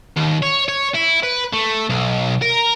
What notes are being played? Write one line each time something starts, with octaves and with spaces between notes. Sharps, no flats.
D#2
C#5
C#5
E4
B4
A3
B1
A#4